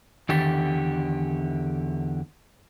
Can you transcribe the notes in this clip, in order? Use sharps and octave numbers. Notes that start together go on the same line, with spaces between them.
E2 D3 D#3 G4 A6 B6